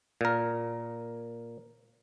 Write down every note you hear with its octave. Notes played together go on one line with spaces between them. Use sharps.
A#2 A#4